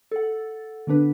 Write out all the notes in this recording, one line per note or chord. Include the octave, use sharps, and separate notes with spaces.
A4 F#5
D3 B3 D4 B4